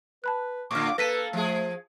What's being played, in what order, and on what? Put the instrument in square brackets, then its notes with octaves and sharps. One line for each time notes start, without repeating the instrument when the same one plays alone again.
[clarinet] B4 [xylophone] A5 B5 F#6
[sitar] A2 D3 [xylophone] C#6 F6 [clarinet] D6
[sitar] A#3 A4 [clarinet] B4 [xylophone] A#6 B6 D#7
[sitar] F3 G#4 [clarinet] A3